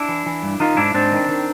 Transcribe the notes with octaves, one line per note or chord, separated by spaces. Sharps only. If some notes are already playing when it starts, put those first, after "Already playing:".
Already playing: D4 E4
E3
E3
G2
D#3 D#4 F4
G#2 D4 E4
G#2 C4 D4
D#3
D#3